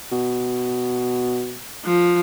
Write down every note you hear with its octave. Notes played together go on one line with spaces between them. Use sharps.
B2
F3